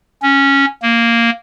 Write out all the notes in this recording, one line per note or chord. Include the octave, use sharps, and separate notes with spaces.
C#4
A#3